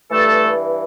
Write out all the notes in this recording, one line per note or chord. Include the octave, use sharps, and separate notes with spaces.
G2 E3 A3 A4